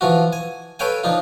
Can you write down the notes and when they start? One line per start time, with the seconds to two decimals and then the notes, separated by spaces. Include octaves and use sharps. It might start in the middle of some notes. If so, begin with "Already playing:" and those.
0.01 E3 F3 F4 F#4
0.33 G#5
0.79 A4 B4 C#5 F5 G5 G#5
1.04 F3 D4 D#4 F4